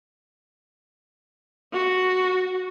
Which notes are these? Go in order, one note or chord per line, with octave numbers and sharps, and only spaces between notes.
F#4